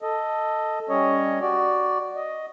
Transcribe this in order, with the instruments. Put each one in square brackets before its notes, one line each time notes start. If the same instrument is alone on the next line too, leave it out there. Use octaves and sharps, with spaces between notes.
[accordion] A4 D#5
G3 C#4 C#5 D#5
F#4 D5
D#5